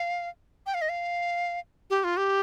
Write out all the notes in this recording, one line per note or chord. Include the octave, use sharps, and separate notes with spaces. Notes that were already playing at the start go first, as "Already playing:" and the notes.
Already playing: F5
G5
F5
D#5
F5
G4
F4
G4